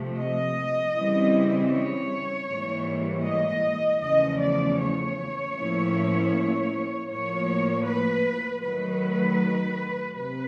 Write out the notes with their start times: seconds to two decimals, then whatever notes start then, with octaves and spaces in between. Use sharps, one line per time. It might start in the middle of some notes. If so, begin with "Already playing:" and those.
Already playing: C3 F3 A3
0.18 D#5
0.95 C#3 E3 G3 C4 E4
1.71 C#5
2.49 G#2 E3 G3 A#3
3.25 D#5
4.02 E2 C#3 F3 A3 D#5
4.40 D5
4.79 C#5
5.56 A2 F3 A#3 C#4 E4
7.10 A2 F3 A#3 C#5
7.86 B4
8.63 D#3 F#3 A3 B4
10.17 C3 B4